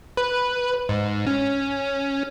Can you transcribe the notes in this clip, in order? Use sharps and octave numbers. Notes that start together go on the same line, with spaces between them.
B4
G#2
C#4